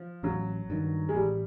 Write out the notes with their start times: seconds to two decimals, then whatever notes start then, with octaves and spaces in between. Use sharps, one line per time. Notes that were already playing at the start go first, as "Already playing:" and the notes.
Already playing: F3
0.23 A1 F#3
0.70 G2 D#3
1.09 G#3
1.15 A1 G3